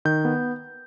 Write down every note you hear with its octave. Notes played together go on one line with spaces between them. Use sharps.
D#3 G6
B3